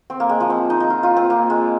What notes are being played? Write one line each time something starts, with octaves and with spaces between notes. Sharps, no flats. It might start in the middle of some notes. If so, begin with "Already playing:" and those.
C4
A#3
G#3
F3
C4
D#4
D#4
F4
F4
C4
A#3
G#3